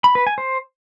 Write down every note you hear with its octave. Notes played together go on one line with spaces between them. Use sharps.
B5
B4
G#5
C5